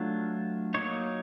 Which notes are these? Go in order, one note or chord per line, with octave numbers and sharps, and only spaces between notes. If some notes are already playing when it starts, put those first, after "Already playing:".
Already playing: F#3 A3 D4 F4
F#3 A#3 D#4 C#5